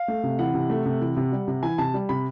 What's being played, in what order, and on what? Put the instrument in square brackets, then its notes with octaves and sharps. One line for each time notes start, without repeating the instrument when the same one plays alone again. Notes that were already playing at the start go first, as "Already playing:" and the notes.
Already playing: [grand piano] F5
A3
C3
E3 F#5
C3
A3
C3
E3
C3
G3
C3
E3 G#5
C3 A5
G3
C3 B5